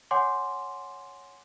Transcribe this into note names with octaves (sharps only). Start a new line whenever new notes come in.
C#5 F#5 G#5 C6 D6